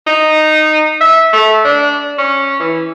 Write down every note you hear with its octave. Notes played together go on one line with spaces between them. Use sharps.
D#4
E5
A3
D4
C#4
E3